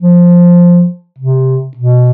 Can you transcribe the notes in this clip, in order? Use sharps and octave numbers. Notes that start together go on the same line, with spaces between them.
F3
C3
B2